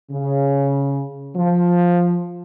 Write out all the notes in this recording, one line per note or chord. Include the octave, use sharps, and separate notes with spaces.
C#3
F3